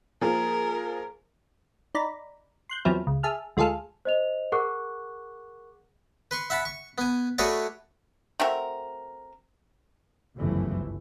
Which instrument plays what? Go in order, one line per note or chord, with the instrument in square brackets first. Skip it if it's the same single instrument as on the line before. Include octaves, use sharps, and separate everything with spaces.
[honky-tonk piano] F3 A#3 G#4 [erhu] A#4
[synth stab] D#4 D5 A#5 B5
C6 F#6 G6
E2 F3 F#3 C4 E4 F6
C#2
G#4 E5 A5 F6
D2 G#3 F4 G#4 A4 F6
[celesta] C5 D#5 F7
G#4 A#4 F#5 C#6 D6 F#6
[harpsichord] B4 C6 C#6
E5 F#5 A5 B5
C#6
B3 G#5
A3 F#4 G#4 B4 C#5 D5
[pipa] A3 C4 F#4 A#4
[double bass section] G1 C#2 F#2 E3 F3 A3